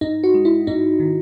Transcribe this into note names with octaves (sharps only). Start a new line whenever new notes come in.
G#2 D#4
F#4
G#3
E4
G#2 D#4
D#3